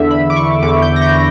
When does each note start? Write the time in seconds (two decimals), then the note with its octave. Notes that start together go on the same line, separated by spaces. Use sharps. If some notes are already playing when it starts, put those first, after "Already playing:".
Already playing: E2 D3 E5
0.11 B5
0.30 D6
0.36 C#6
0.63 E2 D3 D6
0.82 G6
0.96 A#6
1.01 G6